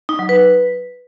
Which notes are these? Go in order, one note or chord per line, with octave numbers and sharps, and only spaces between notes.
D#4
F#3
B4